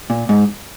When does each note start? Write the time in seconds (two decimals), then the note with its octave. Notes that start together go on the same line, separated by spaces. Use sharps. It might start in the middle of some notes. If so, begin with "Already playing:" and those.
0.10 A#2
0.29 G#2